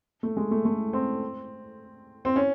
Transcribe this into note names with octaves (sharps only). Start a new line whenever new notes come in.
A3
G#3
A3
A3
C4
C4
C#4